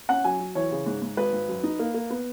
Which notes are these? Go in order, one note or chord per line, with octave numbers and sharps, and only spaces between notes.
C#4 F#5
F#3 G#5
F#3
E3 C#5
C#3
G#2
G#2
G#1 B4
G#1
F#2
D#4
A#3
A#3
B3